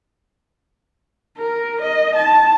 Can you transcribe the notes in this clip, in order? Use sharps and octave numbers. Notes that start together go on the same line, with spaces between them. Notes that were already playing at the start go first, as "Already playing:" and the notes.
A#4
D#5
A5